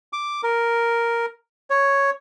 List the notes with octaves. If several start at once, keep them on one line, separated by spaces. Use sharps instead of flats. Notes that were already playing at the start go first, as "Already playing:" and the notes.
D6
A#4
C#5